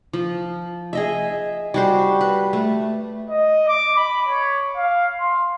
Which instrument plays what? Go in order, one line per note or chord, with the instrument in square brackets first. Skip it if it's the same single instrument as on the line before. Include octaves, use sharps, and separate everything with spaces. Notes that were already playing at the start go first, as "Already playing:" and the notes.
[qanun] F3
G#4 D#5 E5
G3 F#4 C5
B4
A3
[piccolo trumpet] D#5
D6
B5
C#5
F5
C6